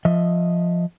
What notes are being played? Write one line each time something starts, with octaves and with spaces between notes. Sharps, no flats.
F3 D#5 E5